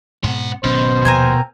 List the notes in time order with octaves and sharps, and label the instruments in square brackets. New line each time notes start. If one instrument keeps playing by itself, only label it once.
[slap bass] G#2 B2 [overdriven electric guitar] C4 F#5
[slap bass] G#1 F#3 C#4 [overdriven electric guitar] B2 [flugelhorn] C5
[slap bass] D#2 A#2 F3 [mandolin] C4 A#4 G#5